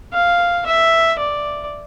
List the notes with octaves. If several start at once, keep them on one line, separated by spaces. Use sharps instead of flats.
F5
E5
D5